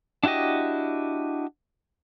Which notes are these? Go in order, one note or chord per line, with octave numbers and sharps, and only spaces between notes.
D4 E4 F#4 G4 D#5